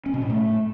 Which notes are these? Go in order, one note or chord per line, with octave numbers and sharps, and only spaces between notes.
C#4
B2
A2
A3